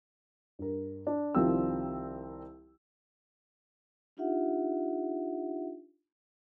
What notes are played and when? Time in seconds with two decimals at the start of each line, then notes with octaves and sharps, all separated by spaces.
0.59 G2 A#4
1.07 D4
1.35 C2 D#3 F3 G3 C4 E6
4.17 D4 D#4 F4 G4 E5 F#5